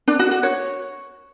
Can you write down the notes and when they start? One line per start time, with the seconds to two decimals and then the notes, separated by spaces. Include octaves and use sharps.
0.08 D4
0.19 F#4
0.31 F#4
0.43 C#5